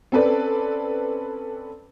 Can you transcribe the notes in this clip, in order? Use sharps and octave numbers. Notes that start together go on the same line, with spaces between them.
C4 C#4 A4 B4 D5